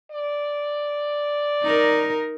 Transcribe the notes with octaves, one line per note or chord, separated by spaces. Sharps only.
D5
D#4 A#4